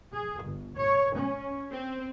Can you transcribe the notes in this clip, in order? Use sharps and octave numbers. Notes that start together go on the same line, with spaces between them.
G#4
G1
C#5
C#4
C4